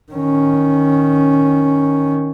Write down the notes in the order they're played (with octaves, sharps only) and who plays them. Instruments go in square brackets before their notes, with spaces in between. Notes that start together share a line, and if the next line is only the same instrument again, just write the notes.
[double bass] D#3 C#4